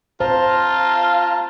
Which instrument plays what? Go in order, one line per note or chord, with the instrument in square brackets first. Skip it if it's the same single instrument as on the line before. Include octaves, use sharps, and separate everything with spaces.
[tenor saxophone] F4 [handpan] C5 [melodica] A5 A#5